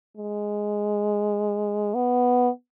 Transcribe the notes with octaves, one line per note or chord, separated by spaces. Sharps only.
G#3
B3